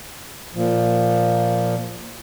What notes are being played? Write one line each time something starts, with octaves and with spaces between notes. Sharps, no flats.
A#2 F3